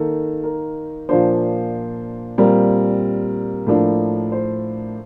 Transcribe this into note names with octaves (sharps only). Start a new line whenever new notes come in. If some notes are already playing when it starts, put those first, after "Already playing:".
Already playing: D#3 A#3 D#4 A4
A#4
A#2 F3 A#3 D4 C5
A#2 G3 C4 A#4
A2 F3 A#3 D4
C5